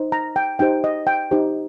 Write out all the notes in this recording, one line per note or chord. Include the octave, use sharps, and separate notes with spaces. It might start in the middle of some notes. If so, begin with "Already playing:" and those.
Already playing: D#4 C5
A#5
G5
D#4 G4 C5 G5
D#5
G5
D#4 G4 C5